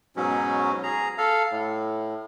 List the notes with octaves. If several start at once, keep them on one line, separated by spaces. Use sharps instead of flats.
G#2 B2 F#3 C#4
G#4 A#5
A4 F5
A2